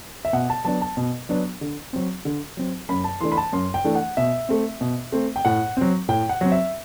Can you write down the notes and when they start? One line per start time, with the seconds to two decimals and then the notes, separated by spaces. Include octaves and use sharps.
0.25 E5
0.33 B2 F#5
0.50 A5
0.65 F#3 B3 D4 A5
0.81 A5
0.97 B2
1.29 F#3 B3 D4
1.61 D3
1.93 F#3 C4
2.25 D3
2.57 F#3 C4
2.89 F#2 B5
3.04 A5
3.21 E3 A3 D4 C6
3.32 B5
3.37 A5
3.53 F#2 C6
3.74 G5
3.84 E3 A3 D4
3.95 F#5
4.17 B2 E5
4.49 A3 C4
4.81 B2
5.12 A3 C4
5.36 G5
5.45 A2 F#5
5.77 F#3 C4
6.09 A2 G5
6.29 F#5
6.41 F#3 C4
6.52 E5